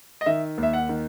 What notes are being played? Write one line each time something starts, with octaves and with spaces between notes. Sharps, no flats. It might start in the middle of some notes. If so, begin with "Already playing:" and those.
D#5
D#3 E5
D#2
E5
F#5
D#3